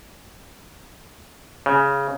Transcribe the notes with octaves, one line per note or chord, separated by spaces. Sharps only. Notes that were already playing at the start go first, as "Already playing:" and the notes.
C#3